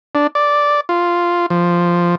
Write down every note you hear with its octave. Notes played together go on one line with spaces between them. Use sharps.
D4
D5
F4
F3